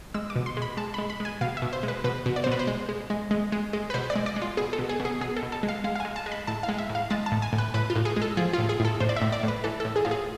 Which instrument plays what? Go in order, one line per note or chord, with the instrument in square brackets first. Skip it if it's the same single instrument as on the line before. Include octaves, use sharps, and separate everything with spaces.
[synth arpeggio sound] G#3 E6
D6
B2
C6
G#3 B5
G#3 A5
G#3 B5
B5
G#3
G#5
B2 F5
E5
B2
C5
G#3
B4
B2 B4
B2
D5
B2 C5
B4
C5
G#3
G#3
G#3
G#3
G#3
G#3
B4
B2 C5
D5
G#3
D5
G#3
F4
B2 G#4
A4
B2
G#4
B2
G#4
B2 G#4
A4
B2
A4
G#3
F5
G#3 F5
F5
G#3 G#5
A5
G#3
B5
A2 A5
F5
G#3
E5
A2
F5
G#3 A5
A5
A2
G#5
A2
B4
A2 B4
F4
A2
G#4
G#3
A4
F3 G#4
F4
A2
G#4
A2 A4
A2 C5
D5
E5
A2
D5
A2
B4
E3 A4
A2 A4
G#4
A2 F4
G#4